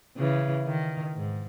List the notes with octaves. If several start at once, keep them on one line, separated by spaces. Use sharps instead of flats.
C#3 E3
D#3
G#2